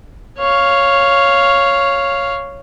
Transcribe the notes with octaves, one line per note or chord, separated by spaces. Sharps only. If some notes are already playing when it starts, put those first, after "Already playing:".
C#5 F5